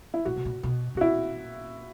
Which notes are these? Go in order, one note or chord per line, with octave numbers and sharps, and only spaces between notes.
E4
A#2 F#4
B2
A#2
B2
B2 F#4
A#2 E4